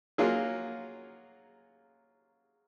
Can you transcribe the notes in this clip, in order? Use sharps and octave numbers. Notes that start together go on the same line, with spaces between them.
F#3 A#3 C#4 F4 G#4